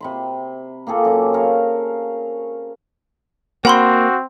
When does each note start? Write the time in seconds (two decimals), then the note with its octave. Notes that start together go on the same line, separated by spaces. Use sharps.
0.01 C3 B5 C6
0.87 A#3 C4 G#4 A4
1.05 F#2 D6
1.34 A#4 C#5 F5
3.65 A#3 C4 F#4 F#5 B5 C6